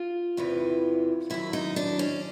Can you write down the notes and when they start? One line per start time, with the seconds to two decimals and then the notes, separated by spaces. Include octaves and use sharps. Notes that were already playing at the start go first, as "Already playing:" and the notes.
Already playing: F4
0.37 E2 C3 E3
1.30 F#2 D#3 F#3 E4
1.53 D#4
1.76 D4
1.99 C#4